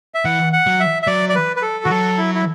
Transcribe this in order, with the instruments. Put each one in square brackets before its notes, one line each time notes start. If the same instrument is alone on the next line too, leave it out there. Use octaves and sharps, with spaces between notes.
[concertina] E5
[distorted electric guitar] E3 [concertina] F#5
[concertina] F#5
[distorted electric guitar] F#3
[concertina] E5
E5
[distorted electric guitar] F#3 [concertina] D5
[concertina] D5
B4
B4
A4
[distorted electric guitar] E3 [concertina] F#4
[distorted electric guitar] F#3 [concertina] A4
[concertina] E4
E4